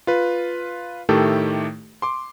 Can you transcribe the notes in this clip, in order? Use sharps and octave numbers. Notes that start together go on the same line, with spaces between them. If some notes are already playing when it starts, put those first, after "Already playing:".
F4 B4
A2 D#3 A3 G4 A4
C6 D6